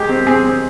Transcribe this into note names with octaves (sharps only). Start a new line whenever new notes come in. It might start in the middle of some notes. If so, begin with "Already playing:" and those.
Already playing: D#3 G#3 G4
C4
C4 G#4
C4